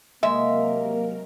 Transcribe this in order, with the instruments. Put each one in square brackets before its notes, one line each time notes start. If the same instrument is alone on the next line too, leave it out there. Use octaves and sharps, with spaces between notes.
[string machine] C3 F#3 A#4 [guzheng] G#3 [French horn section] A#3 [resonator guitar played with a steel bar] E5